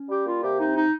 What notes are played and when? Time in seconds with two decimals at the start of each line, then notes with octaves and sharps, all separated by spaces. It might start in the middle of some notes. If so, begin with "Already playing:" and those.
Already playing: C#4
0.09 G3 G4
0.25 A#3 F4
0.42 C3 G4
0.58 C4 D#4
0.75 D#4